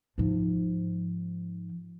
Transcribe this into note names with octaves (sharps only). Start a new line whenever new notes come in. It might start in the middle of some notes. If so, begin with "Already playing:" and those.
G#2 F3